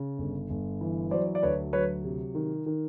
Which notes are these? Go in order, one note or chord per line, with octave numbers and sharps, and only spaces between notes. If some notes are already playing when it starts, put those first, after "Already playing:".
Already playing: C#3
G1
G1
E3
F#3 C5 D5
D5
D2 B4 C#5
F#3 B4 C#5
C3
D#3
D#3